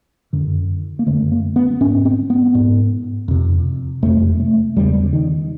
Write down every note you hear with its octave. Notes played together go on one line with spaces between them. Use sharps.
F#2 D3
A#3
F#2 D3 A3
A#3
B3
G#2 C#4
C4
B3
G#2
F2 C3
F2 C3 A3
A3
E2 C#3 G3
D#3